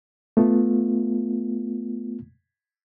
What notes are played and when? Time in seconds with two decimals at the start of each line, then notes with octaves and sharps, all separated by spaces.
0.37 A3 B3 F4